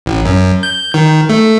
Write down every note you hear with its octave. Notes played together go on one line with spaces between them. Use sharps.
A1
F#2
G6
D#3
A3